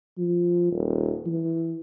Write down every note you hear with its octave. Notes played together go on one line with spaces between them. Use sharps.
F3
D#1
E3